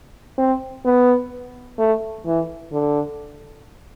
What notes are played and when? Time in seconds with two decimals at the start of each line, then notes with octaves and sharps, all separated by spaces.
0.38 C4
0.85 B3
1.78 A3
2.26 E3
2.72 D3